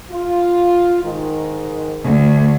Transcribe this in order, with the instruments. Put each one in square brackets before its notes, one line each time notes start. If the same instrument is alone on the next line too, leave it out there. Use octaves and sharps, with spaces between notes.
[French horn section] F4
G#2 D#3
[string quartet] D2